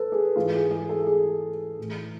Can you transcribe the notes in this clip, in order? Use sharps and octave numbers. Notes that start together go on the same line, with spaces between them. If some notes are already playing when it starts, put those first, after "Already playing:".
Already playing: A4 B4
G#4
G#2 E3 F4
G#4
G#4
A4
G#4
A2 E3